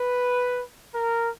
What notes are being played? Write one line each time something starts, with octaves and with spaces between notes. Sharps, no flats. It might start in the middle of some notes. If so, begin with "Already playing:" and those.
Already playing: B4
A#4